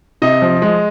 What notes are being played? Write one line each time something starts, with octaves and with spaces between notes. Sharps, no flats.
C3 D#5
F3
G#3